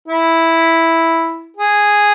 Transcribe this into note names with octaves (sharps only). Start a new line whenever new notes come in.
E4
G#4